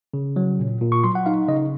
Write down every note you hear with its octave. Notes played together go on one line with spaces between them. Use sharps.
C#3
F#3
A#2
A#2
C#6
F#3 C6
F#5
D#4 F5
C#3 D#5